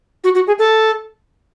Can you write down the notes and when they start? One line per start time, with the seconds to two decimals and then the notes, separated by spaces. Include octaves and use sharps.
0.24 F#4
0.35 F#4
0.47 G#4
0.59 A4